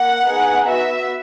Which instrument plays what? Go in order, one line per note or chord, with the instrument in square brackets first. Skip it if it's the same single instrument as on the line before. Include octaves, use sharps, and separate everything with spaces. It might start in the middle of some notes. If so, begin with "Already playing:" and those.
Already playing: [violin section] A#3 F#5
B3 D#4 G#4
B3 F#4 E5